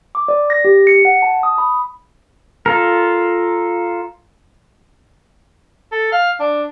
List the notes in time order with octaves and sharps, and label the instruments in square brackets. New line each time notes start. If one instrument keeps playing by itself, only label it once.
[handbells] D6
D5
A#6
G4
C#7
F#5
A5
D#6
B5
[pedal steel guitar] F4 A4 A#4
[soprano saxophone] A4
F5
D4